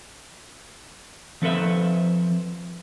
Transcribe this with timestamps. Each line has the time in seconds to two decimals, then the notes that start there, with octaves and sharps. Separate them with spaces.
1.42 F3 C4 A4 B4 E5